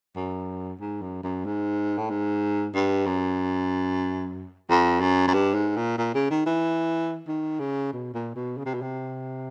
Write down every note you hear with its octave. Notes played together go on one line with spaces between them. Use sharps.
F#2
G#2
F#2
F#2
G#2
A2
G#2
G2
F#2
F2
F#2
F#2
G2
G#2
A#2
A#2
C#3
D#3
E3
D#3
C#3
B2
A#2
B2
C#3
C3
B2
C3